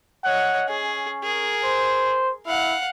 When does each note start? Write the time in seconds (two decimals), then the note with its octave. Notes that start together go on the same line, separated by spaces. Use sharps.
0.25 C#5 D#5 F#5
0.69 C#4 G#4
1.24 G#4 A#4
1.64 C5
2.46 E4 F5 F#5